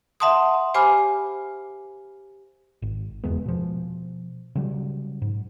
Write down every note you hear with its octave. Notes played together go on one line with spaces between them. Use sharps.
E5 F#5 A5 C6 D#6
G4 C5 G#5 B5 D6 F6
G#1
F#1 E2 G#3 B3
B2 F3
C#3 F#3 G3
G#2